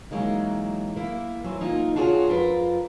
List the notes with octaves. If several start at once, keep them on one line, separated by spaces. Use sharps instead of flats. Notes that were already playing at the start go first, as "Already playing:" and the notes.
E3 F#3 G#3 A#3 D#4
A#3 E4
E3 F#3 C4
A#3 D#4 F4
D4 F4 F#4 G#4 C#5
F2 F4 A#4 B4